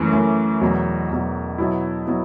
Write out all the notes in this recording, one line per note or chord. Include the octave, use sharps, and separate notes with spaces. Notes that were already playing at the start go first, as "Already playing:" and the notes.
Already playing: F#2 E3 A3 C#4
F#2 E3 A3 C#4
E2 B2 F#3
E2 B2 F#3
B2 F#3 B3 E4
F#3 B3 E4